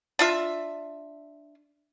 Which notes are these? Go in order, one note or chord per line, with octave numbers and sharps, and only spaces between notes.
D4 F4 E5